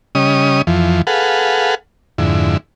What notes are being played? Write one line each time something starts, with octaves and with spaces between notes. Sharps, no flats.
C#3 G3 C#4 D#5 D#6
F2 E3 F3
G#4 A4 B4 F5 F#5
F2 G#2 D3 E4